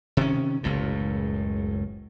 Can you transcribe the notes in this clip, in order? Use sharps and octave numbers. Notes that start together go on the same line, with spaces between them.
C3 D#3 C#4
F#1 C#2 A2